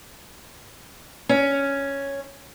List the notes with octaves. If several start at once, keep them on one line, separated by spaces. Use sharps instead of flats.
C#4